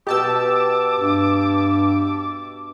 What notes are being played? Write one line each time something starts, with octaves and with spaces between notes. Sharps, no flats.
B2 G4 D#5 A5 D6 E6
G2